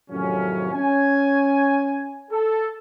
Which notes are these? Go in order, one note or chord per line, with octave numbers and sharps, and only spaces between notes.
F2 A2 C3 D#3 F#3 C#4
C#4 G#5
A4